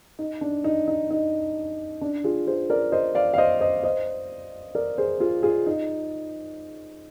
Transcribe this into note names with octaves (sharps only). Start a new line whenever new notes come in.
D#4
D4
D#4
D#4
D#4
D4
F4 G#4
G#4 C5
A#4 D5
C5 D#5
D5 F5
F5
C5 D#5
C5 D#5
C5 D#5
A#4 D5
G#4 C5
F4 G#4
F4 G#4
D#4